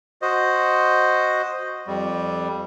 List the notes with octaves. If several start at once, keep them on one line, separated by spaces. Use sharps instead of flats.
F#4 C5 D#5
F2 G3